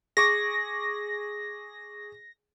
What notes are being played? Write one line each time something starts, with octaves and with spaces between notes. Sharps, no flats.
G#4 C#6 D6 A#6